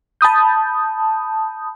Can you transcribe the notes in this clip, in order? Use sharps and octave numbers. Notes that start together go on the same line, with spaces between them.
A5 B5 D#6 G6